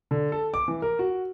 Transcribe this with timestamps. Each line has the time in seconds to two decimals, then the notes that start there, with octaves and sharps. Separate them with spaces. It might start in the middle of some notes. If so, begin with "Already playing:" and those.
0.11 D3
0.32 A4
0.54 D6
0.68 E3
0.82 A#4
0.99 F#4